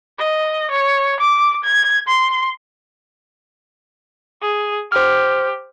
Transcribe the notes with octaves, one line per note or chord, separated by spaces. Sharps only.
D#5
C#5
D6
G#6
C6
G#4
G4 C5 F6